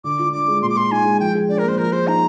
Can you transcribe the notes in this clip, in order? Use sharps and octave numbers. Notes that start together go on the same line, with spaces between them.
D3 D6
F4
D4 D6
G#3
A#2 C6
D6
G#4 C6
D#4 G#5
G#3
F3 G5
G#4
D4 D5
A#4
A#3 C5
F3 A#4
G#4 C5
D#4 A#5